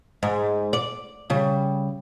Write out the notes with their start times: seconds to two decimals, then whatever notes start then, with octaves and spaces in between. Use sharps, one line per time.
0.23 G#2
0.73 D5
1.30 C#3 G3